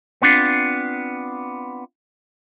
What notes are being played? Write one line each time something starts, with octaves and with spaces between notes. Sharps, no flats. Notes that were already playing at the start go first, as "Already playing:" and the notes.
B3 C4 D4 F4